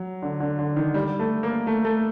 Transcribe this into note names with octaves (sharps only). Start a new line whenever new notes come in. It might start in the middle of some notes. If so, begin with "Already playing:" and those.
Already playing: F#3
D3
D3
D3
D#3
G3
A3
A#3
A3
A3